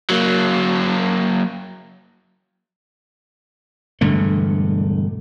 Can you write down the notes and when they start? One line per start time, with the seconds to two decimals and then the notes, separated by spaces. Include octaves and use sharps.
0.10 F#3 A#3
4.01 E1 G2 D3 A3